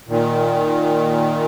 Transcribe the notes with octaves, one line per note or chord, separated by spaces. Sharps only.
A#2 D#3